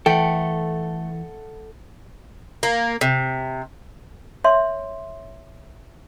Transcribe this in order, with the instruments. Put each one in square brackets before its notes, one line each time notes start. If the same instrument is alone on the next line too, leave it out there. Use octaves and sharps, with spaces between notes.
[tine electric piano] E3 [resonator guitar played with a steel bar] A3 [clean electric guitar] A4 F#5 [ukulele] G5
[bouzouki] A#3
C3
[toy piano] C#5 E5 C6